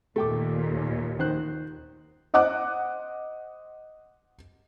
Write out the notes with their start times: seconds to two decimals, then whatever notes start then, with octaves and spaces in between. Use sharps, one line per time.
0.16 D#2 A#2 A3 G5 D6
1.19 D#3 C5 F#6
2.34 C5 D#5 F#5 D6 F#6